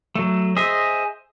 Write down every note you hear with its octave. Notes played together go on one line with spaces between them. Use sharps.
F#3 A3
G#4 C5 D#5 E5